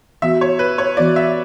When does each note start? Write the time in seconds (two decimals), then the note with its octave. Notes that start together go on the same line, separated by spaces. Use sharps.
0.22 E3 B3 F#4 E5
0.41 C#5
0.59 B4
0.78 C#5
0.97 E3 B3 F#4 D5
1.16 E5